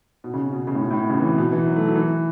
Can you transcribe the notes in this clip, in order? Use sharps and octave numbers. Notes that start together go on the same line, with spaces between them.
B2
C#3
B2
C#3
A2
B2
A2
B2
C#3
E3
B2
B2
E3
F#3
A3
F#3
E3